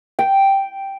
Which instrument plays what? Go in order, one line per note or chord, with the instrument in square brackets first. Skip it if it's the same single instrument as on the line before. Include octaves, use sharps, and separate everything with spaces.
[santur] G5